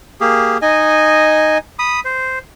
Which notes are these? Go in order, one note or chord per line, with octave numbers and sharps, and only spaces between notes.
A#3 G4 G#4
D#4 D#5 G#5
B5 D#6
C5